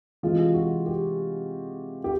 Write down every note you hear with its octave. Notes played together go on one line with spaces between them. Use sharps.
C3 E3 G#3 F4
F#4
G4
G4